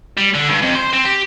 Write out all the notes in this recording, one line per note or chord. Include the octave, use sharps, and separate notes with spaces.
G3
D3
G2
F2
C5
C4
G4